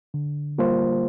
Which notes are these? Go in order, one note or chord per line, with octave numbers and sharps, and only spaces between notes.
D3
G3 A#3 F4 C5